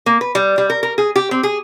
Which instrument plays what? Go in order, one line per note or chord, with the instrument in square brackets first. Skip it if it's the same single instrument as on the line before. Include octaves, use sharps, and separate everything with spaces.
[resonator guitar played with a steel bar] A#3
B4
G3
G3
A#4
A#4
G#4
G4
C4
G#4